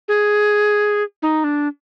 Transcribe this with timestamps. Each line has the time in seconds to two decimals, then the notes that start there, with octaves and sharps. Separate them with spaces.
0.08 G#4
1.22 D#4
1.44 D4